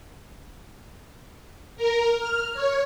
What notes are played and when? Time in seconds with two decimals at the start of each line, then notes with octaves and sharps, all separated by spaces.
1.76 A#4
2.19 F6
2.54 C#5